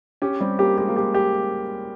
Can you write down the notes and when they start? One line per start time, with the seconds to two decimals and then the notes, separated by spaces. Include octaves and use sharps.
0.22 C#4 G4
0.40 G3 C4
0.59 A#3 G4
0.77 G#3 G4
0.89 A#3
0.96 G#3 G4
1.14 G4